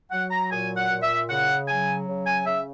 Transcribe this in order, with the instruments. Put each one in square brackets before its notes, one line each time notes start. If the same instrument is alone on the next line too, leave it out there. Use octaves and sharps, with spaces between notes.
[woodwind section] F#3 F#5
A#5
A#2 G#5
F#5
A#2
E5
C#3 F#5
F#3 G#5
C#3
G#5
C#3 E5